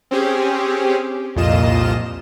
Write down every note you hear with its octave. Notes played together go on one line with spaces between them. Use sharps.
C4 C#4 G4 G#4
C2 F2 A#2 F4 D#5 E7